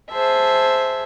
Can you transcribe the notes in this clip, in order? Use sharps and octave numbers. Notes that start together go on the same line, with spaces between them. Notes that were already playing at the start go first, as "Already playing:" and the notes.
G#4 C5 E5 A5